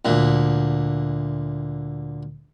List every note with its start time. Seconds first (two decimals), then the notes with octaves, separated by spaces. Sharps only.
0.05 D2 A#2